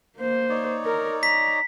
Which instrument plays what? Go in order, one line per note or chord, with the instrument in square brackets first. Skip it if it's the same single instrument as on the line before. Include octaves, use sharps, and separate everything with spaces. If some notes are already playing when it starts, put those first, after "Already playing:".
[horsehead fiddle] A#3 C5
[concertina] D#4 C#5 D5
[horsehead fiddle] A#4
[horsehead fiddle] A#5 [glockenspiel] B6